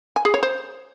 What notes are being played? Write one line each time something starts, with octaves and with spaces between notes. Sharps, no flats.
G#5
G#4
C#5
C5